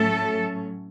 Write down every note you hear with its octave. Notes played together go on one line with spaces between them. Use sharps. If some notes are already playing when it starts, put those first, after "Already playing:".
Already playing: A2 F#3 A3 C#4 A4